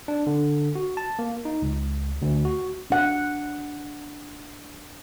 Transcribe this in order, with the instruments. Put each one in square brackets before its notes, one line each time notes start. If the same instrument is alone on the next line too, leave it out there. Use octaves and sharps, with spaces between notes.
[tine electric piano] D4
D3
F#4
A5
A#3
D#4
C#2
D2
F#4
[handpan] D4 F#5